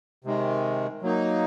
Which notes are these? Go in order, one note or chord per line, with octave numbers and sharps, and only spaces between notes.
C3 D#3 G#3
F#3 A#3 D#4